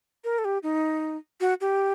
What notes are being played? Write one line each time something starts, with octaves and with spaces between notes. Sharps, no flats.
A#4
A4
G4
D#4
F#4
G4